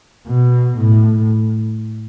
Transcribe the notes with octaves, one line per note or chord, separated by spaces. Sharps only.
B2
A2